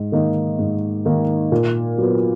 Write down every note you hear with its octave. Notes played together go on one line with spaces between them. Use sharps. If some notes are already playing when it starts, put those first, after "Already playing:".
Already playing: G#2
D#3 A#3 D#4
G#2
D#3 A#3 D#4
A#2
F#3 B3